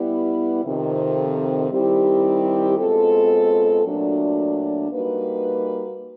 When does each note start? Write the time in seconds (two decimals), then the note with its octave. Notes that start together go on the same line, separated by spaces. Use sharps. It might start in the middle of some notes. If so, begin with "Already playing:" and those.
Already playing: G3 B3 E4
0.64 F2 C3 D#3
1.71 D#3 G3 C4 E4 G4
2.78 B2 G#3 C4 F4 A4
3.84 A#2 F#3 A3 D4 F#4
4.91 G3 A#3 D#4 F#4 B4